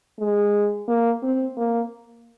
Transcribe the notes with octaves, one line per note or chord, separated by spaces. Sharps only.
G#3
A#3
C4
A#3